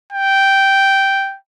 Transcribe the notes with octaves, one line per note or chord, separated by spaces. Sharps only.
G5